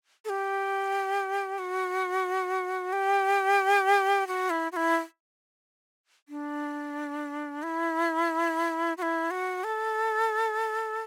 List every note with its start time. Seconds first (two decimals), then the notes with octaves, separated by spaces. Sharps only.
0.25 A4
0.29 G4
1.58 F#4
2.93 G4
4.27 F#4
4.50 E4
4.72 F#4
4.76 E4
6.29 D4
7.63 E4
8.97 F#4
9.02 E4
9.31 F#4
9.64 A4